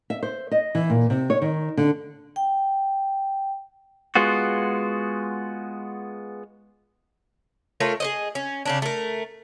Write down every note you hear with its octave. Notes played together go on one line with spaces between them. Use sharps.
E5
C5
D#5
E3
A#2
C3
C#5
D#3
D3
G5
G#3 B3 F4 F#4
A3 F4 A#4 C#5
G#4 C5 D#5
C#4
C#3 C#4 D4
A3 A#4